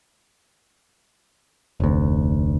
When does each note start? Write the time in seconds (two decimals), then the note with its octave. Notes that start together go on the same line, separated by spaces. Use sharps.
1.80 F1 D2